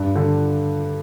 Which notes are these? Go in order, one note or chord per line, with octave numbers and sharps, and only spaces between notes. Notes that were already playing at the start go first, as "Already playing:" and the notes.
Already playing: G2 D4
D3